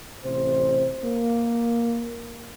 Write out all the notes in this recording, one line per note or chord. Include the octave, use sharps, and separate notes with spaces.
A1 C3 C5
A#3